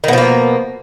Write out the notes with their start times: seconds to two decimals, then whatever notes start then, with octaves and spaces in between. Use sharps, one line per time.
0.04 D#3
0.08 B2
0.13 F3
0.18 A#3